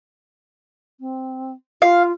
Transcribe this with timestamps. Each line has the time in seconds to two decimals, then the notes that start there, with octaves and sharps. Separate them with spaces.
1.00 C4
1.82 F4 F5